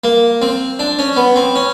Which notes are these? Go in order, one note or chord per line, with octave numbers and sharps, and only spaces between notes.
A#3
C4
D4
C#4
B3
C4
C#4